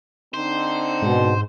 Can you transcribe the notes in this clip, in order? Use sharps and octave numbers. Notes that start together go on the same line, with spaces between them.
D3 C4 D#4 C5
G#2 B2